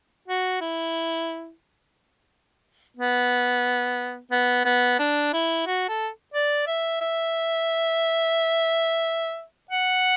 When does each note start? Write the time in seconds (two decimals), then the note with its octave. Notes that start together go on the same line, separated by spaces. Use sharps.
0.28 F#4
0.61 E4
2.97 B3
4.32 B3
4.65 B3
4.99 D4
5.33 E4
5.67 F#4
5.89 A4
6.34 D5
6.67 E5
7.01 E5
9.71 F#5